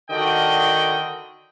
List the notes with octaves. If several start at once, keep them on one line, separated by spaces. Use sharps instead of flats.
D3 D#3 F#4 D5 D#5 G5